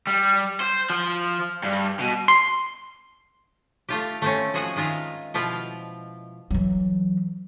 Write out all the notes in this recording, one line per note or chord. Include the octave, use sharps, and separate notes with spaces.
G3
C5
F3
G2
B2
C6
A3 F4 G4
A3 C4 C#4
F3 G#3 F#4 G#4
D#3 G#3 F4 E5 F5
B2 F3 E4 F4
E3 F#3